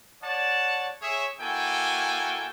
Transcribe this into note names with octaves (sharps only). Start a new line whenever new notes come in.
C#5 D5 F#5 A5
G#4 C#5 E5
A#3 E4 F#4 A4 G5 G#5